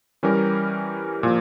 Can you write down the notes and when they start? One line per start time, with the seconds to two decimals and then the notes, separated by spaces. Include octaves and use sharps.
0.23 E3 G3 C#4 G4 A#4
1.23 A#2 F3